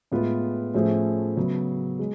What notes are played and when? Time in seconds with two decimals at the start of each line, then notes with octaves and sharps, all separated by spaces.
0.12 A2 G#3 B3 F4 B4
0.74 A2 F3 A3 C#4 G#4
1.37 C#3 F#3 B3
1.99 G#3